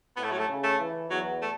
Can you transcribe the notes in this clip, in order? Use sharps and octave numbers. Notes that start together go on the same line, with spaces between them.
A2 B3
A3
F#3
A3
C#3
A3
E3
E2 F#3
A3